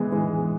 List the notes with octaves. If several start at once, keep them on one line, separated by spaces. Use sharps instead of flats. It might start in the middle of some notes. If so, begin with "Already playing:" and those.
Already playing: E3 G#3 B3
E3 G#3